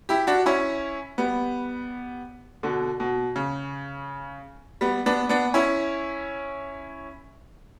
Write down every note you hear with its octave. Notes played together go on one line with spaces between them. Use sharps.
E4 G4
D4 F#4
C#4 E4
G3 B3
B2 D3
B2
C#3
G3 B3
B3 D4
B3 D4
C#4 E4